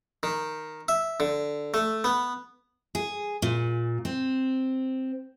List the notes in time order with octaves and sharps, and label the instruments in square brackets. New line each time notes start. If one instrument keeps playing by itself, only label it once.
[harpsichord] D#3
E5
D3
A3
B3
[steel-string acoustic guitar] G#4
A#2
C4